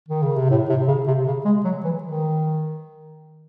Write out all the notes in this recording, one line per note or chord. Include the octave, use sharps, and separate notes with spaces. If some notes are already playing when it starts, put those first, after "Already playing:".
D#3
C#3
C3
A2
C3
C#3
C3
C#3
G#3
F#3
E3
D#3